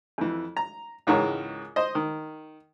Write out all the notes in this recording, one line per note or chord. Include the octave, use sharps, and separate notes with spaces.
F2 E3
A#5
C#2 G#2 E3 A#4 C#5
C5 D#5
D#3